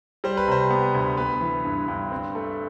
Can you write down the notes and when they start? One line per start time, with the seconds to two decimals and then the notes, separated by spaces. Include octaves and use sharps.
0.24 G3 C5
0.37 B4
0.48 C3 C5
0.70 B3
0.95 D2
1.17 B3 B4
1.41 E3
1.65 G2
1.88 G2
2.12 C4
2.35 A3